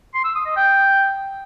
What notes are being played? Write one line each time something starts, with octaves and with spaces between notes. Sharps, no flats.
C6
E6
D#6
D#5
G5